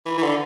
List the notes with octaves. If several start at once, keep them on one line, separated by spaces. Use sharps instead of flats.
E3
E3
D3